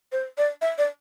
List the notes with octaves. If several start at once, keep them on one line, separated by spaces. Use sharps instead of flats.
C5
D5
E5
D5